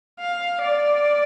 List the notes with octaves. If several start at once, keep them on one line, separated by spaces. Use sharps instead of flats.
F5
D5